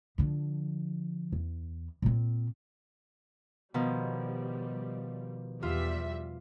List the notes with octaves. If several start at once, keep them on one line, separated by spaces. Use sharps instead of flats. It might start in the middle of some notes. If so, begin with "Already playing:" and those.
D3 F3
E2
A#2 C4
B2 D#3 F3 G3
E2 G3 F4 E5